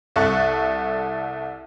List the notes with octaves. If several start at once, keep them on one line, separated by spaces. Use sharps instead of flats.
C2 A4 C#6 F#6